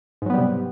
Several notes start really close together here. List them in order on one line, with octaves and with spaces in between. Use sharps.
G#2 F#3 B3 G3 C3